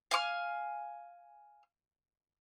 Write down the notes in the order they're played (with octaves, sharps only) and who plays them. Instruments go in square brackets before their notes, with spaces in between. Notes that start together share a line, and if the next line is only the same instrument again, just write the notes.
[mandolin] F5 G#5 C#6 F6